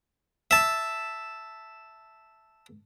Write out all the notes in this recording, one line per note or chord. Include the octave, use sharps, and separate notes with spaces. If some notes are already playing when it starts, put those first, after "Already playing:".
E5 A5